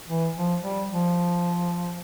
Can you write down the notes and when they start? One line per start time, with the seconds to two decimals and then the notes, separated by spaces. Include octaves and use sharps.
0.07 E3
0.36 F3
0.63 G3
0.91 F3